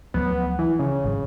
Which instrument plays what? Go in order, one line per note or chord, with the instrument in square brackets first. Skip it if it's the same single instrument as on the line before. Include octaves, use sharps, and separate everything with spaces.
[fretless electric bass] D2 F3 F#3 [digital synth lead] B3
[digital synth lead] E3
C#3
[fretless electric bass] G#1 G#2 F3